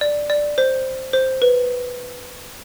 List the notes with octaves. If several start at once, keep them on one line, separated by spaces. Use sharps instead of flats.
D5
D5
C5
C5
B4